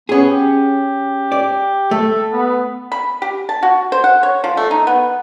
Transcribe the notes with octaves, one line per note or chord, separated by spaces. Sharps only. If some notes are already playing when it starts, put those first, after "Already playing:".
B3 C#4 G#4
G4
D5
A3 A4
B3
B5
G4
A5
F#4
C5
F#5
C#5
F3
A3
D#4
B3